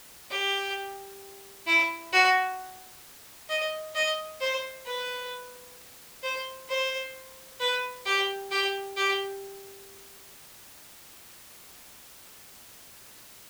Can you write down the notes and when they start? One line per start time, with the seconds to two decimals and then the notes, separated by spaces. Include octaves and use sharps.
0.30 G4
1.67 E4
2.12 F#4
3.49 D#5
3.95 D#5
4.41 C5
4.86 B4
6.23 C5
6.69 C5
7.60 B4
8.06 G4
8.51 G4
8.97 G4